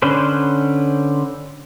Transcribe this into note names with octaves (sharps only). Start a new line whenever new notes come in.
D3 C#4 B4 C5